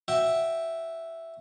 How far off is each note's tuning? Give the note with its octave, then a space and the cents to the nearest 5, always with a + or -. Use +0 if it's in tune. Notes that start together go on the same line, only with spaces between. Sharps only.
F#4 +0 E5 +0 G5 +0